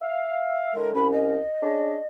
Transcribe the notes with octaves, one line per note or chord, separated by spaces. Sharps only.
E5 F5
A2 D3 G#3 A#4
C2 C#4 B5
D#5
C#4 D4 G#4